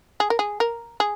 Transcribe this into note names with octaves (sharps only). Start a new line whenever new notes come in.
G#4
A#4
G#4
A#4
G#4